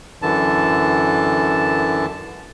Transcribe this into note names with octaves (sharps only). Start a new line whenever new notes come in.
F#2 D3 E3 A5